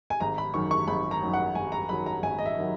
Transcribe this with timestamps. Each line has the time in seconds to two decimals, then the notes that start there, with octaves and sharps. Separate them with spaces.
0.10 G#5
0.20 G#1 A#5
0.38 B5
0.54 F#2 D#3 F#3 C#6
0.71 C#6
0.87 G#1 B5
1.11 A#5
1.21 F#2 D#3 F#3
1.33 F#5
1.55 G#1 G#5
1.72 A#5
1.89 F#2 D#3 F#3 B5
2.06 A#5
2.23 G#1 G#5
2.38 D#5
2.46 E5
2.58 D#3 F#3